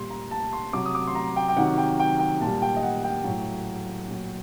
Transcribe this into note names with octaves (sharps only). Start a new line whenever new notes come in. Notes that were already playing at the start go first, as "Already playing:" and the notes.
Already playing: A#2 G3 C6
A#5
A5
C6
C3 F#3 D6
D#6
D6
C6
A#5
G5
G5
C3 D#3 F#3 F#5
G5
G5
G5
A#2 G3 A5
G5
D#5
F#5
G5
A2 F#3
A#2 F#3